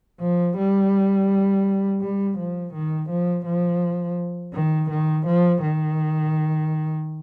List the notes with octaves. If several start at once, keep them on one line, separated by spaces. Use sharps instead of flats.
F3
G3
G3
F3
D#3
F3
F3
D#3
D#3
F3
D#3